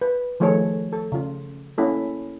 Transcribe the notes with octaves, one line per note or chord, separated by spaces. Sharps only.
B4
D#3 F3 A3 G#4 A4 C#5
A4
C#3 F4
A#3 C#4 E4 A4